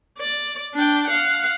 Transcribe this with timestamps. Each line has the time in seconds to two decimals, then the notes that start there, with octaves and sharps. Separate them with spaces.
0.19 D5
0.74 D4 G5
1.07 F5 F#5